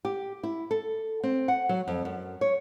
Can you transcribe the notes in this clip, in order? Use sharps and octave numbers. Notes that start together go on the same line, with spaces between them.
G4
E4
A4
C4
F#5
F#3
F2
F#2
C#5